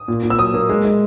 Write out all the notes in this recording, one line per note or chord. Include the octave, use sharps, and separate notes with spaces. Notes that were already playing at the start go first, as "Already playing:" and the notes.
Already playing: D#6
A#2
A#2
E6
F#3 D#6
A#3
G#3
G#3